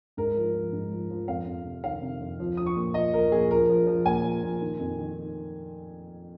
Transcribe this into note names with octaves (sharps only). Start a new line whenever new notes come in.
G#2 A#4
F3
F3
G#2
F3
F3
F2 F5
F2
C3
D#3 F5
C3
F2
F3
F3 D#6
C#6
A#2
F3 D#5
F3 A#4
A#2 G#4
F3 A#4
F3
F3
A#2 G#5
F3
A#2
D#3
F2
D#3